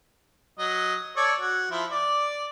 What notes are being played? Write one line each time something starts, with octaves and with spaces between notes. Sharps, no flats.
F#3 D#5
A4 C#5 D5
F#4
F3 E4 E5
D5